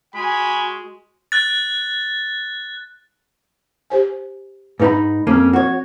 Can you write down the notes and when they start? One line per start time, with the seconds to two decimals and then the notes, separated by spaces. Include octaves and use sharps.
0.15 G#3 F#4 G#5 B5
1.32 F#6 A6
3.90 G4 C5 G#5
4.80 G#2 D#4 B4 B5
5.27 F2 A#3 C4 C#4
5.53 F#4 C#5